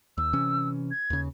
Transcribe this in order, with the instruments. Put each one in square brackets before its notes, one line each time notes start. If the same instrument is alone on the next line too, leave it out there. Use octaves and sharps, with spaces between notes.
[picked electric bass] D#2 [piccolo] E6
[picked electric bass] C3 E3 C#4
[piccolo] G#6
[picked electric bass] D#2 C#3